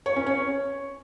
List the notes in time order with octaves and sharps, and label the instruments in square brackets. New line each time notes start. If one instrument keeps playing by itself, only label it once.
[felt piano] C#5
C#4
C#5